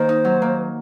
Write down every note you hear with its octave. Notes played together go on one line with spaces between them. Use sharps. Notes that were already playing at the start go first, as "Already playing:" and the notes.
Already playing: D#3 A#3 C5
D#4
F#3
A#3